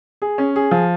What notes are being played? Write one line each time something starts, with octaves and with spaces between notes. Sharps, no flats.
G#4
C#4
G#4
F3